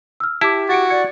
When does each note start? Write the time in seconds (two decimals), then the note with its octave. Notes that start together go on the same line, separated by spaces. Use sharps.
0.20 E6 F6
0.41 E4 G4 A5 D6
0.69 F#4 A6 C#7 D7
0.90 D5 G#6 C#7